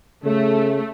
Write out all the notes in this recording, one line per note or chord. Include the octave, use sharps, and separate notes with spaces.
C#3 A3